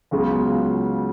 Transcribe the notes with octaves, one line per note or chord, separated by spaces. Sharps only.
C#2 C#3 F#3 B3 F4